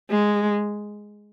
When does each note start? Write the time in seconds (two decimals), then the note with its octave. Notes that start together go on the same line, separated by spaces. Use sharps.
0.10 G#3